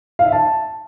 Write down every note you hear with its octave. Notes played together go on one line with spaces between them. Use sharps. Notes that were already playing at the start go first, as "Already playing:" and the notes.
F5
E5
A5